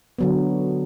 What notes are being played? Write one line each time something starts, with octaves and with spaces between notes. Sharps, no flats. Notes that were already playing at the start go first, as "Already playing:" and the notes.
D3 F#3 B3